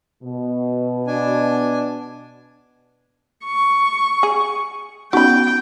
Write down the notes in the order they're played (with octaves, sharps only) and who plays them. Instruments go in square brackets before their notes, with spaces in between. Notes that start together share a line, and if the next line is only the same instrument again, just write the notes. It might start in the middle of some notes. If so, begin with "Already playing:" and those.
[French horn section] B2
[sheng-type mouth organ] D4 G#5
[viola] C#6
[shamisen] G#4
[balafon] B3 C#4 D#4 [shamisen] F#4 B5 [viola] G5